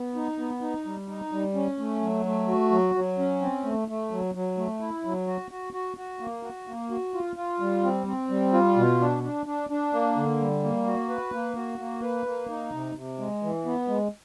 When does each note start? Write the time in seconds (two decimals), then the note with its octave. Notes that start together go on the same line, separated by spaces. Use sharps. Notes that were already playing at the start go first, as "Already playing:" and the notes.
Already playing: B3
0.15 D#4
0.39 B3
0.61 D#4
0.86 G3
1.09 D#4
1.32 G3
1.55 C#4
1.79 A3
2.01 F#3
2.25 A3
2.48 F#4
2.71 F#3
2.95 F#3
3.18 C#4
3.42 C4
3.64 A3
3.88 A3
4.11 F#3
4.35 F#3
4.57 A3
4.81 E4
5.05 F#3
5.27 F#4
5.51 F#4
5.73 F#4
5.97 F#4
6.20 A#3
6.43 F#4
6.68 A#3
6.90 F#4
7.14 F4
7.36 F4
7.60 G3
7.83 C4
8.07 C4
8.30 G3
8.53 F4
8.76 B2
9.00 D4
9.23 D4
9.46 D4
9.70 D4
9.93 A#3
10.16 D3
10.40 G3
10.63 A#3
10.87 F#4
11.09 B4
11.33 A#3
11.56 F#4
11.79 A#3
12.02 B4
12.26 A#3
12.50 D#4
12.72 C3
12.95 C3
13.18 G#3
13.43 E3
13.66 B3
13.88 G#3